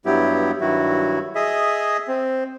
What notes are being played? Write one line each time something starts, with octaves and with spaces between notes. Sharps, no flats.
G2 F#3 B3 E4 G4
G2 D#3 F#3 E4 F#4
G#4 D#5 E5
C4